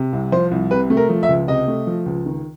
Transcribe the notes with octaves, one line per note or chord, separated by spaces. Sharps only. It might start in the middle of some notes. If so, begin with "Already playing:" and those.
Already playing: C3
C2
F3 C5
C2
C3 B4
A3
A#4
F3
E5
C#2
C3 D#5
A3
F3
C#2
D#3